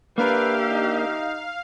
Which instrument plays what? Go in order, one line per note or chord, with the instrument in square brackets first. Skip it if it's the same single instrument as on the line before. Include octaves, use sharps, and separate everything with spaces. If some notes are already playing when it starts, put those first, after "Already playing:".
[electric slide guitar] A#3 D4 A#4 [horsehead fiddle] G4 E5 [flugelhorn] B4 [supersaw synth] F5
[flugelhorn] D#4